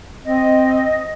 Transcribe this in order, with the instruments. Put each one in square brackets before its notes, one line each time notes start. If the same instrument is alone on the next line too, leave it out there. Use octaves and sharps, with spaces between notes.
[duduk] C4 [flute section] D#5